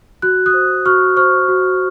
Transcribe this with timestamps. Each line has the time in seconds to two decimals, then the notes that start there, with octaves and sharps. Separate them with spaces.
0.22 F#4 F#6
0.46 D#6 F#6
0.54 C5
0.86 F#4 C#6 F6
1.16 C5 C#6 F6
1.48 F#4